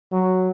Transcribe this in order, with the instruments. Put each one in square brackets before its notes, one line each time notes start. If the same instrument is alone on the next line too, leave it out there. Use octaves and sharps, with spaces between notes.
[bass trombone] F#3